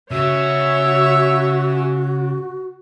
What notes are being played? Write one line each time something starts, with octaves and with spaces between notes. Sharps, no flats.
C#3 F#4 G#4 C#5 E5